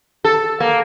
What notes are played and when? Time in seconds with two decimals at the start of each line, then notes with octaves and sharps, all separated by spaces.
0.24 A4
0.60 A#3